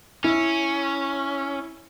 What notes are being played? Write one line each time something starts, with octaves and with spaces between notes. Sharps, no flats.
C#4 E4